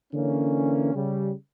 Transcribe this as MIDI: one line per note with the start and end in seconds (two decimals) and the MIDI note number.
0.13 0.92 50
0.13 0.92 52
0.13 0.92 58
0.13 0.92 61
0.95 1.31 49
0.95 1.31 55